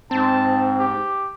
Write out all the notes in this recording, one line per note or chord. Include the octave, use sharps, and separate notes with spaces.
G#2 C4 A5
G4